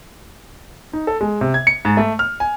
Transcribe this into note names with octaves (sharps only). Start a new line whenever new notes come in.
D#4
A4
G#3
C3
G#6
C#7
G#2
A3
F6
G#5